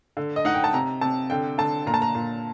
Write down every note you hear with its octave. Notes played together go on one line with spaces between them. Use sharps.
D3
D#5
D#4 F#5
G5
A5
C3 A#5
C3 A5
D3 G5
D3 A5
A#2 A#5
A5
A#5
A#2